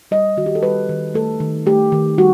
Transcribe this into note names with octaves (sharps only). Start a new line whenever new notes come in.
G3 D#5
D#3 F#4
G4
A4
G3 B4
D#3
A3 A4
D#3
A3 G4
D#3
G3 F#4